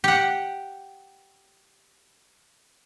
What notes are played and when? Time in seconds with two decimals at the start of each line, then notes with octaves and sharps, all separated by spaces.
0.04 G4 F#5